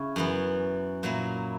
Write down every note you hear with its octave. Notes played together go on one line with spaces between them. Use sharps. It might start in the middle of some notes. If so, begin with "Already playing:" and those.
Already playing: C#3 C#4 E4
F#2 E3 B3
A#2 F#3 A#3 E4